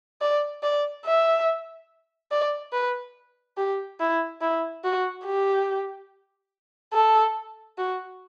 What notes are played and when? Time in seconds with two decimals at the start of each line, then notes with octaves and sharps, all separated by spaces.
0.21 D5
0.63 D5
1.05 E5
2.31 D5
2.73 B4
3.57 G4
4.00 E4
4.41 E4
4.84 F#4
5.25 G4
6.93 A4
7.78 F#4